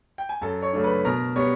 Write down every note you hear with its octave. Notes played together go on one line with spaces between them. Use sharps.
G5
G#5
F#2 A4 A5
C#5 C#6
C#3 F#3 A3 D4
B4 B5
B2 A#4 A#5
G3 B3 C#5 C#6